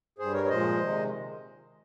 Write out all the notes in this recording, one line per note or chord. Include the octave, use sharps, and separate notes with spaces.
G2 G3 G#4 C5
A#4 C#5
C#5
A#2 F3 G#3 C5 D#5
C3 D#3 G#3